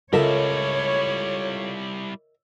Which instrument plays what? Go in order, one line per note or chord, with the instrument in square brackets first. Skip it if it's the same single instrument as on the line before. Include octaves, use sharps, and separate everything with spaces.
[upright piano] C#2 A4 [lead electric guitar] G3 E4 [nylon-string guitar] A#4 D#5 E5 [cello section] C#5